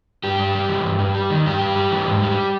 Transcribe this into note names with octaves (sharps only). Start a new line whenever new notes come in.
G2 G4
G2
G3
E3
G2
G2
G3
D#3
G2 G4
G2
G3
E3
G#2
G3